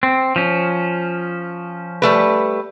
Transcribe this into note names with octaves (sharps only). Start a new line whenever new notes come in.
C4
F3 C#4
G3 A3 B4